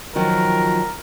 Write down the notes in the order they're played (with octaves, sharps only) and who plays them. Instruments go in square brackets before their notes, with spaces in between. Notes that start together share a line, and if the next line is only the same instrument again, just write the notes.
[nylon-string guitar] D#3 F3 F#3 [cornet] A#4